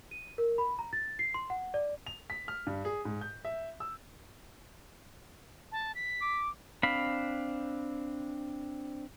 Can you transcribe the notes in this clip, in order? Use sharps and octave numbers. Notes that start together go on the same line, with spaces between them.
D#7
A#4
B5
A#5
A6
C7
C6
F#5
D5
F7
B6
F6
G2
G#4
G#2
G6
E5
E6
A5
B6
D6
C4 D4 F5 B5